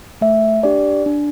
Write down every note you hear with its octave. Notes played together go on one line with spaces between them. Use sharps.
A3 E5
D4 G4 D5
D4